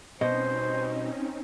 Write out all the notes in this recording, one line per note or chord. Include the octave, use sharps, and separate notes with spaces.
B2 G3 C4 C#4 D#4 C5 D#5